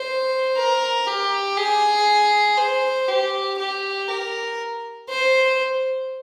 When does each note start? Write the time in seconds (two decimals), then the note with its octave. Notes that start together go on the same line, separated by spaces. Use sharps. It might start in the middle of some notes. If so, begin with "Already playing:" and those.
Already playing: C5
0.57 A#4
1.07 G4
1.57 G#4
2.58 C5
3.08 G4
3.59 G4
4.08 A#4
5.09 C5